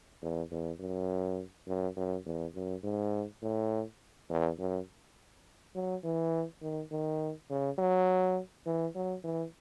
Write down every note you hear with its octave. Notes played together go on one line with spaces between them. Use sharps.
E2
E2
F#2
F#2
F#2
E2
F#2
G#2
A2
E2
F#2
F#3
E3
D#3
D#3
C#3
F#3
E3
F#3
E3